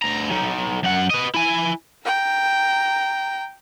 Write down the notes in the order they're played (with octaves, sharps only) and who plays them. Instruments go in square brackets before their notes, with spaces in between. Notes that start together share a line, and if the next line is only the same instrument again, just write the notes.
[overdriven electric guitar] D2 A#5
F#3 D#4
F#2 F#5
B4 D#5
E4 G#5
[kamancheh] G5 A#5